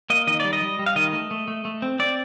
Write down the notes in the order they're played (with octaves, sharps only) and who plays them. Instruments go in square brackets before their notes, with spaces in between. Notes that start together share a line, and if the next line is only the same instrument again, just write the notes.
[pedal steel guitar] A#3 D#5
D#3 D#5
G3 D5
D#5
G3
G3
F5
D#3 D#5
A3
A3
A3
A3
C4
C4 D5